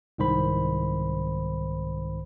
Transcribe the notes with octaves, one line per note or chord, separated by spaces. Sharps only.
C2 G#2 D#3 C5 B5